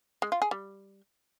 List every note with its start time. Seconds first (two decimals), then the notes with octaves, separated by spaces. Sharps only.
0.22 G#3
0.32 F4
0.42 G#4
0.51 G3